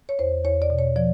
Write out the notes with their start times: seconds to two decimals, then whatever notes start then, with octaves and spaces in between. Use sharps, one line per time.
0.09 C#5
0.19 E2 C5
0.45 E2 C#5
0.62 D5
0.70 B2
0.79 C#5
0.96 F3 D5